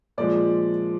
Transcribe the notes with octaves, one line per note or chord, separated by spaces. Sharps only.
A#2 F3 G#3 D5